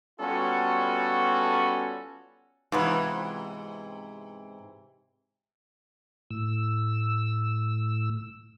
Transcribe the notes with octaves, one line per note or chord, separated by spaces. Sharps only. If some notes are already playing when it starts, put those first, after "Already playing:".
G3 B3 C#4 F4 F#4 A4
G#2 C3 E3 F3 B3 B4
A2 E6